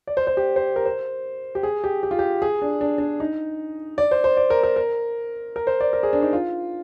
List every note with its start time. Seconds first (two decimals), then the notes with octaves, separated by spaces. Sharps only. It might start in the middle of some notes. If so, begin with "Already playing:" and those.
0.07 D5
0.17 C5
0.27 C5
0.37 G4
0.56 C5
0.76 A#4
0.86 C5
1.55 G4
1.63 G#4
1.84 G4
2.03 G4
2.11 F4
2.19 G4
2.42 G#4
2.62 D4
2.81 D4
2.98 D4
3.20 D#4
3.98 D5
4.11 C5
4.24 C5
4.37 D5
4.50 A#4
4.63 A#4
4.76 A#4
5.56 A#4
5.67 C5
5.80 D5
5.93 A#4
6.03 G#4
6.13 D4
6.23 D#4
6.33 F4